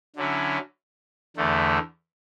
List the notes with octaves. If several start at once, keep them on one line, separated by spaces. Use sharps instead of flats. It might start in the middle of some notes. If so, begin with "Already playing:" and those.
D3 F#3 C#4 E4
E2 D3 A3